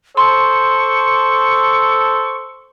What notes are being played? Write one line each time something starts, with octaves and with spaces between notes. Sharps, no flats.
A4 C5 C6 C#6